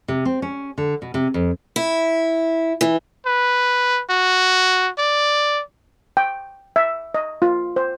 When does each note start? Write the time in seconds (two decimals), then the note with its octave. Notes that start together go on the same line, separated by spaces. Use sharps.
0.08 C3
0.25 C4
0.42 C#4
0.78 D3
1.02 B2
1.14 C3
1.34 F2
1.76 E4
2.81 E3
3.26 B4
4.10 F#4
4.98 D5
6.17 G5
6.76 E5
7.14 D#5
7.42 F4
7.76 C5